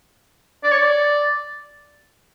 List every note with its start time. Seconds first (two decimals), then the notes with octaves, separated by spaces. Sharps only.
0.63 D5
0.71 C#5
0.79 D5